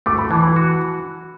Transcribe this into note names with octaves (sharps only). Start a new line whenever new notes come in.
A3 D6
B5
E3 A5
B5
F#4